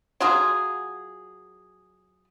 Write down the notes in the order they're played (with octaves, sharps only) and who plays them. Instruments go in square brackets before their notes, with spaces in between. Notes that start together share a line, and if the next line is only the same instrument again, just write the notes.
[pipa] F#3 F4 G#4